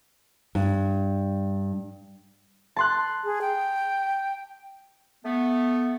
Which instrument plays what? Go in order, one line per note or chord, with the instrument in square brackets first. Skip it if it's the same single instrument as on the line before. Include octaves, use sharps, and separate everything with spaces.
[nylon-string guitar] G2
[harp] A5 C6 F#6
[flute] G#4
G5
[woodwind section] A3 B3